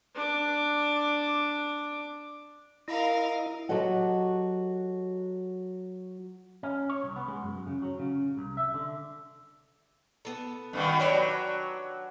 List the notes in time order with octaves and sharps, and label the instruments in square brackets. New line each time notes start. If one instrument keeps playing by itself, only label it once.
[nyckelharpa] D4 D6
[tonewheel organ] E4 D#5 [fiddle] A#4 F5
[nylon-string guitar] F#3 F#4 G4 A4 D#5 F#5
[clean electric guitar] C#4
C#5
C2
B3
G#3
F#2
C#3
F#3
C#3
C2
E5
D3
[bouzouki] B3 A4
[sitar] G2 B2 D#3
[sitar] F#3 [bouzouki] D4 G4 C#5